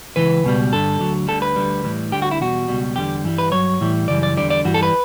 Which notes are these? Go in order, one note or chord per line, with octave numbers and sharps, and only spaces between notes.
C#2 C#3 E3 B4
C#2 B2 G3
G2 D3 G3 A4
D2 D3 F#3
D2 D3 G3 A4
B4
D2 D3 G3
A2 E3 G3
D2 D3 G3 G4
F#4
E4
E2 B2 G3 F#4
C#2 B2 G3
E2 D3 G3 G4
G2 E3 G3
B4
G2 F#3 C#5
A2 E3 G3
F#2 C#3 E3 G3 D5
D5
E2 D3 G3 D5
D5
G2 E3 G3 F#4
A4
B4